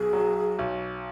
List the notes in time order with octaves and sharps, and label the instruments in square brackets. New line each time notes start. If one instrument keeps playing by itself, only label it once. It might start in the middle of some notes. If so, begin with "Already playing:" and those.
Already playing: [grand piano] B1 B2 [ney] G#4
[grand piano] F#3
B1